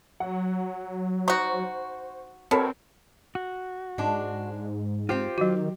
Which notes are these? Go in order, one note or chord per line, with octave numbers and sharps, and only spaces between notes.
F#3 F#5
D#4 F#4 C5 C#6
B2 C4 A4 A#4 C#5
F#4
G#2 G#3 D4
C4 F4 G4 C5
D#3 F#3 F#4